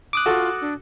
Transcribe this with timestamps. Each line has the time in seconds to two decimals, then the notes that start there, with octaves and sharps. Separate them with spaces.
0.13 D6 D#6 F#6
0.26 F4 F#4 A4
0.62 D4